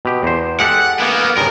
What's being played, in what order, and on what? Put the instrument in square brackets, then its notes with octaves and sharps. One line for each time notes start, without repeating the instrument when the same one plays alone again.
[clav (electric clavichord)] B2 G4
E2 C5
[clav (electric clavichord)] G#3 G4 A4 [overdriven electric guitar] F#5
[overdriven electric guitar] A#3 B3
[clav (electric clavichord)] G2 C#3 [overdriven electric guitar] A#4